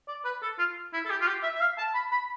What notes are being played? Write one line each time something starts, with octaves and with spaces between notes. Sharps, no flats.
D5
B4
A4
F4
E4
A4
G4
F4
G4
E5
E5
F5
A5
B5
B5